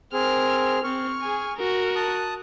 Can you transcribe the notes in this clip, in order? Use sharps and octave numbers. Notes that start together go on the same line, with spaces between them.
C4 G#4 A#4 F6
C4 C#6 F6
G#4 G#5
F#4 A#4
A5 D#6 F#6